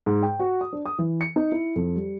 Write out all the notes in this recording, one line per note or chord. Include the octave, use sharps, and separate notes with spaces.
G#2
G5
F#4
D#6
D4
D#6
E3
C#7
D#4
E4
F2
G3